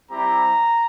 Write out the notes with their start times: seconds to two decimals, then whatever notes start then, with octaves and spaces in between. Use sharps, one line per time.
0.10 G3 C4 E4 G4 A#5